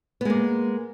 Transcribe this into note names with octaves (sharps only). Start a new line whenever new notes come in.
G#3 A#3 B3